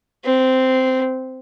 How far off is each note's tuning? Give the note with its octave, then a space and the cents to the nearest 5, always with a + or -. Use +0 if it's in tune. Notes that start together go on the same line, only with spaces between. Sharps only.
C4 -10